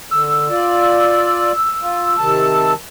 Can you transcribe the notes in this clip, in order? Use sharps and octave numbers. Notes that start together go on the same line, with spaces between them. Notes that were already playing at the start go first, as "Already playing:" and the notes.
D3 E6
F4 D5
F4
C3 D#3 A5